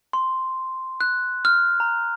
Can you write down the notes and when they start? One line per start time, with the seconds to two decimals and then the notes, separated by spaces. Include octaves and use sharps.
0.13 C6
1.01 F#6
1.45 F6
1.80 A#5